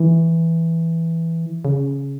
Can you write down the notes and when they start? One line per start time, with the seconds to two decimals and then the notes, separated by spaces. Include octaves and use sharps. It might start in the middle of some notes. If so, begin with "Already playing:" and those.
Already playing: E3
1.65 C#3